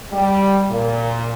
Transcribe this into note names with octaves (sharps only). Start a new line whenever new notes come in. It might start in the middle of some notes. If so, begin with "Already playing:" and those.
G3
A#2